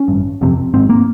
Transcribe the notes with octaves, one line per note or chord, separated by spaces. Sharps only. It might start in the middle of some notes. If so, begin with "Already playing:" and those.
Already playing: C#4
G#1 G2
G1 F2 C3
G#1 G#2 C4
A#3